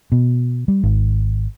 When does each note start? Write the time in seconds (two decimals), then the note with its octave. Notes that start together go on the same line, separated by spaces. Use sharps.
0.12 B2
0.68 G3
0.83 G#1